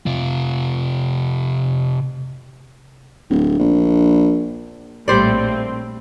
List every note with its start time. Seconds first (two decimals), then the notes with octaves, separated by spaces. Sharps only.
0.06 C3 F4
3.30 D1
3.59 A#1
5.08 A#1 A2 G3 C4 C5 D5